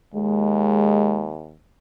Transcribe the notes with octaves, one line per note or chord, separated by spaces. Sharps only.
D#2 G#3